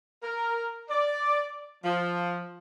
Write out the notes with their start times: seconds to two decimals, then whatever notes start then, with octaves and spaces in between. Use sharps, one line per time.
0.23 A#4
0.89 D5
1.85 F3